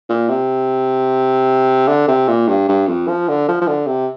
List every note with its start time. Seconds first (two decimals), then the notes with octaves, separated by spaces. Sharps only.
0.09 A#2
0.29 C3
1.88 D3
2.08 C3
2.28 A#2
2.48 G2
2.69 G2
2.88 F2
3.08 F3
3.29 D3
3.48 F3
3.61 F3
3.68 D3
3.87 C3